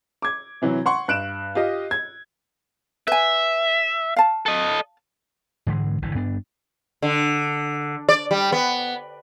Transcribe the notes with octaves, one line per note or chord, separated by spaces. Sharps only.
D6 G#6
C3 E3 F#3
F#5 C6 C#6
G2 F#6 D7 E7
F4 G4 D#5
G#6
B4 E5 G#5
F5 A5
A4 D#5
G#2 D3 E3 G#3
G1 D3 E3
G2 B3 D4
D3
D5
G3
B3